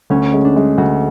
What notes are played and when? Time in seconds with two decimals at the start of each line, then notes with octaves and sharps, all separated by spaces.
0.10 D2 C#4
0.33 G#3
0.45 D4
0.56 G#3
0.78 D2 F#4